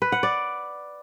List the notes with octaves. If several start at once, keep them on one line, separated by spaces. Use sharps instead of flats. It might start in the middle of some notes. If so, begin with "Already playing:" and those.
B4
F#5
D5